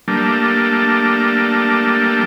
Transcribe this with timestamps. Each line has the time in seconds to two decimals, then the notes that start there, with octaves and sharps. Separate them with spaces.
0.08 G3 A3 A#3 D4